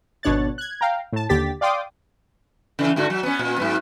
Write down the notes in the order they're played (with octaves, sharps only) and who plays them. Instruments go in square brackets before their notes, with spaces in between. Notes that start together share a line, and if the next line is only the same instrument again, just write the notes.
[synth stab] G#1 B2 D4 C#5 F#6 A6
F#6 G#6
F5 G5 A#5
A2 A5
D#2 D3 G4 A6 B6
D5 F5 G5 C6 D6 D#6
[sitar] C#3 E3
G#2 D3 F#4
F#3
B3 C#4
A#2
G#2 F#3 B3